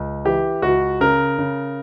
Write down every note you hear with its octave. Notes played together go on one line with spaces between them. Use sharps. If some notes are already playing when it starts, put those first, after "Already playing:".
Already playing: C#2
E3 G4
C#2 F#4
C#3 A#4
C#3